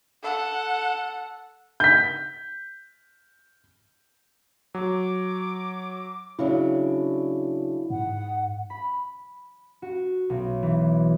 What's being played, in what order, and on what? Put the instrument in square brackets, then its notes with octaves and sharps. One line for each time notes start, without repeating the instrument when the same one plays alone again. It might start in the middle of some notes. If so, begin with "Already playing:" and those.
[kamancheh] A4 F#5
[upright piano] G6 B6
[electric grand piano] F#3 [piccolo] D6
[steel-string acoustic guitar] C#3 F#3 D4 [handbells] E4
[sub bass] G#2 [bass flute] F#5
[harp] B5
F#4
B1
E3